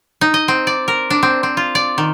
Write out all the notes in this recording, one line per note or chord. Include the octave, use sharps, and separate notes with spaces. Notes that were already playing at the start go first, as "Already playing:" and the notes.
D#4
D#5
C4
D5
A#4
D4
C4
C4
F4
D5
D#3